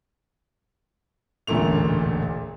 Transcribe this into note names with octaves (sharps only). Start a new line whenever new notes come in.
E1 A1 D2 A#2 A3 F7